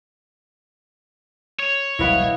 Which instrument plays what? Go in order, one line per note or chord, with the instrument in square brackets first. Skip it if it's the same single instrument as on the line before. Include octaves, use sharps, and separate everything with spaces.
[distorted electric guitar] C#5
[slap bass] E1 C2 F#3 [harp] E4 B4 F#5 [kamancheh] D#5 F5